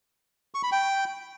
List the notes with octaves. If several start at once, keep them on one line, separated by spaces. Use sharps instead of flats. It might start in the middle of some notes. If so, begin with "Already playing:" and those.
C#6
B5
G5